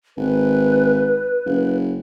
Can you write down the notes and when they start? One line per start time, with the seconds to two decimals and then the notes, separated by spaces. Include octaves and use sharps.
0.17 G#1 B4
1.46 F#1